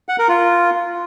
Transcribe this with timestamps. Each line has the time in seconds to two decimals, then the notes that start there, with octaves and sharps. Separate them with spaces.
0.09 F#5
0.19 A#4
0.29 F4